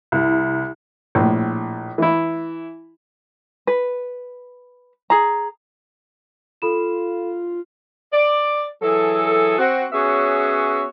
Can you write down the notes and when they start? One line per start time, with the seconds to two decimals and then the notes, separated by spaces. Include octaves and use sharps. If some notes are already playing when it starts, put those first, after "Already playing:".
0.12 C2
1.15 A#1 A2
1.98 E3 E4
3.67 B4
5.10 G#4 A#5
6.62 F4 A4 B5 E7
8.13 D5
8.82 E3 F#3 G#4 A4
9.58 C4 F#4
9.93 B3 C#4 F#4 G#4 C#5 E5